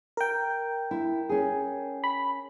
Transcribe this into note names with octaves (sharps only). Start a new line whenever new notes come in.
A#4 G5
E4
C#4 G#4
B5